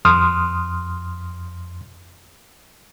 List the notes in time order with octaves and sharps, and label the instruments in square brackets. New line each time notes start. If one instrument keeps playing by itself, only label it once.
[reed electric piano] F2 C6 D#6 F6